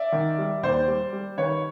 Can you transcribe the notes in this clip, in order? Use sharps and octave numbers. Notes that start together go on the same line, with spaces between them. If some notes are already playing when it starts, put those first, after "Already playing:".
Already playing: D5 E5
D#3
G3
D#2 C5 D5
G3
G3
D#3 B4 C#5